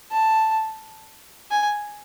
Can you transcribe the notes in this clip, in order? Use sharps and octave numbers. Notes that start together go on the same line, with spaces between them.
A5
G#5